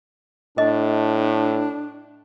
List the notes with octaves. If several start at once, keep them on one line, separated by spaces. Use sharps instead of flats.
A2 D4 D#5